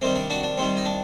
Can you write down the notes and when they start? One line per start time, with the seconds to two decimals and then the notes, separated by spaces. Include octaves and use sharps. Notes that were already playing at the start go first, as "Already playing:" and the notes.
0.01 C3 D#3 G3 C4
0.15 D4
0.30 D4 F#4
0.43 D4
0.58 C3 D#3 G3 C4
0.77 D#4
0.85 D4